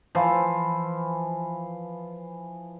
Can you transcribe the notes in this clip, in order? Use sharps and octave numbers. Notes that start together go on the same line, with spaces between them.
E3 F3